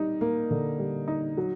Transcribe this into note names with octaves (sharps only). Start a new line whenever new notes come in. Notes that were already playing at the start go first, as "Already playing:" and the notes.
Already playing: G3 D#4
A#3
D3
G3
D#4
F#3